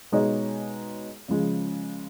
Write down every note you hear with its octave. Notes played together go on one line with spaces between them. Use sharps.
B2 G#3 D#4 G#4 C#5
C#3 F3 G#3